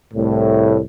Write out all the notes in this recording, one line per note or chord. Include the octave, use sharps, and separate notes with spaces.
C2 A2